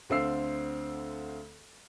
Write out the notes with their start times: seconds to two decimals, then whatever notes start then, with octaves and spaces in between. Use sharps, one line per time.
0.10 D2 D3 C4 F5 E6 C7